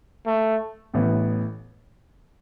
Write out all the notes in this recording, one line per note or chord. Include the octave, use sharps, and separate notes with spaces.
A3
A1 A2 E3 B3